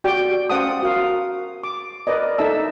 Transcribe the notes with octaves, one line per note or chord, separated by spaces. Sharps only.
F#4 G4 D5 G5
C#4 C5 F5 F#5 A5 D#6
F#4 A#4 F5
D6
A#4 B4 D5 D#5
D#4 A4 E5 A5 E6